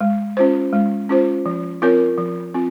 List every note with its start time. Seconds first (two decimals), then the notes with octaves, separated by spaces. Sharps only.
0.01 G#3
0.37 C#4 F4 C5
0.73 G#3
1.09 C#4 F4 C5
1.46 F3
1.82 C4 F4 A#4 C#5
2.17 F3
2.54 C4 F4